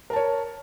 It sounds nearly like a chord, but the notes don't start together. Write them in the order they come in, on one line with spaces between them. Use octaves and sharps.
A#4 A5 C#5